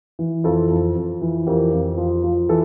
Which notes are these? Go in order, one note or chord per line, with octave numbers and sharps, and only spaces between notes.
E3
F2 F4 A4
F2
F2
E3
F2 G4 A#4
F2
F3
F3
E3 A4